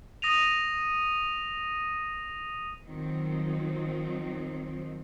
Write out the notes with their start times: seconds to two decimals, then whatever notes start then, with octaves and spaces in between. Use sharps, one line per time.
0.22 D#6 A#6 D#7 F7
2.85 D#3 F3 F#3 C4 D#4